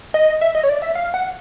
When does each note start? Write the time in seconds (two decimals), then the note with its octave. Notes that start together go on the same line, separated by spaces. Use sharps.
0.14 D#5
0.41 E5
0.55 D#5
0.63 C#5
0.69 D5
0.82 E5
0.95 F5
1.14 F#5